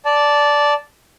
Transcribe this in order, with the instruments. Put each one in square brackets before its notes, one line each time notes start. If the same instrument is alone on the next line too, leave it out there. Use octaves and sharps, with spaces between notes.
[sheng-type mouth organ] D5 A5